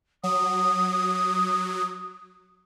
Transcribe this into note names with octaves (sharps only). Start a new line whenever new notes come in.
F#3 D#6